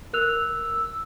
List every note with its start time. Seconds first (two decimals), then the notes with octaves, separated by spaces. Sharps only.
0.13 A#4 E6 F#6 F7